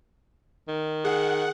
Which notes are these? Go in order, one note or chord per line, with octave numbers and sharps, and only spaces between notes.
D#3
G#4 F#5